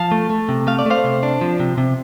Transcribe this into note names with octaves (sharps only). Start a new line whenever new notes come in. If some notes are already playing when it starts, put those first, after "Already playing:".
Already playing: F3 F5 A5
A3
A3
C3
A3 F5
D5
A3 C5 F5
C3
D4
F3
C3
C3